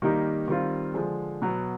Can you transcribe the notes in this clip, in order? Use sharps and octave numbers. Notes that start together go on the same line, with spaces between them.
D#3 G3 A#3 D#4 G4
D#3 G3 C4 F4
D3 F3 G#3
B2 F#3 B3